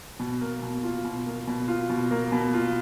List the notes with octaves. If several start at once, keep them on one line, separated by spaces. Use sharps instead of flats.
B2
A#3
B2
F4
B2
A#3
B2
F4
B2
A#3
B2
F4